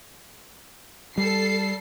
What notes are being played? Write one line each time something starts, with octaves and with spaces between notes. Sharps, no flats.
G3 A4 C7